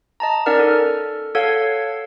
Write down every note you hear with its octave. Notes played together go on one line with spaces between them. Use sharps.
D#5 A5 A#5
C#4 D#4 A#4 D5 F#5 F6
A4
A4 C#5 F5 F#5 E6 G#6